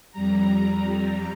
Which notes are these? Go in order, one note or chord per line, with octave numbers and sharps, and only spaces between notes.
F2 G3 A#5